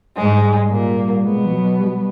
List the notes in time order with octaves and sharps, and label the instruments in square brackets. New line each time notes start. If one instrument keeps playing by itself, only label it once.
[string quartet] G#2 G#3 [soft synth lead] G3
[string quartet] A#2 A#3
[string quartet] B2 B3 [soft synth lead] G#3
[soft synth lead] F3
F#3
G3
F#3
G3